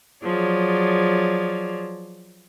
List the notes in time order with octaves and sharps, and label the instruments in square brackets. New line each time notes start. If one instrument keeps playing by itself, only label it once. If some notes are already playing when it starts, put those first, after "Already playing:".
[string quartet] F3 F#3 G#4 C#5 D5